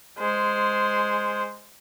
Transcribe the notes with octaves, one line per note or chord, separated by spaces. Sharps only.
G#3 C5